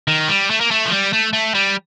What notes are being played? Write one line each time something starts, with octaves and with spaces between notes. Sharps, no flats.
D#3
G3
A3
A#3
A3
F3
G3
A3
A3
G3